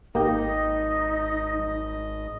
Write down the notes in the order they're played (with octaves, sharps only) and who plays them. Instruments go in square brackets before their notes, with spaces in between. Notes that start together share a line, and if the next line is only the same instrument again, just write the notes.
[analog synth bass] G#1 [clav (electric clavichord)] A#3 G4 G5 [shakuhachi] D#4 [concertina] D#5